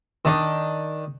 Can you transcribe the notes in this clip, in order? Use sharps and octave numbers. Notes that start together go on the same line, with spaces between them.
D#3 D4 D#4